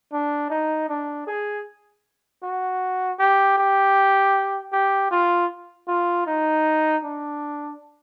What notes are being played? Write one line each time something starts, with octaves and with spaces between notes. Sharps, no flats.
D4
D#4
D4
G#4
F#4
G4
G4
G4
F4
F4
D#4
D4